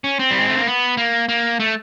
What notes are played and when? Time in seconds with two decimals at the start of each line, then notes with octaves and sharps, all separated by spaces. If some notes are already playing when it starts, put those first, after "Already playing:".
0.04 C#4
0.19 C4
0.31 G3
0.40 G#3
0.48 A3
0.57 A#3
0.66 B3
0.97 A#3
1.29 A#3
1.60 A3